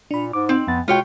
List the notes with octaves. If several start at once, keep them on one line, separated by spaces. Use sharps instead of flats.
A#2 D4 B5
G#2 D6
C4 D#4
F2 B3 A6
B2 G#3 F4 C#5 G5